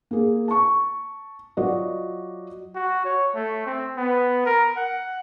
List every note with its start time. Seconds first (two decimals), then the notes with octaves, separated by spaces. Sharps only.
0.11 A#3 G#4
0.48 A5 C#6
1.57 F#3 F4 F#4 D5 D#5
2.75 F#4
3.05 C#5
3.35 A3
3.66 C4
3.97 B3
4.46 A#4
4.77 F#5